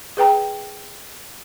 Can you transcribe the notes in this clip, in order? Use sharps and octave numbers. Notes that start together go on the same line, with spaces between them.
G#4 B4 G5 A#5